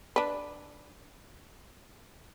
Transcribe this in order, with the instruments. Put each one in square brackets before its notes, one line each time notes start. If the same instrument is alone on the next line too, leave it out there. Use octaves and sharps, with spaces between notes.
[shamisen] D4 B4